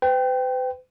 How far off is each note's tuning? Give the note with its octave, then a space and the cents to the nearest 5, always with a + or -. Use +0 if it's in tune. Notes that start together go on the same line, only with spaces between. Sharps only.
B4 +45 G5 +0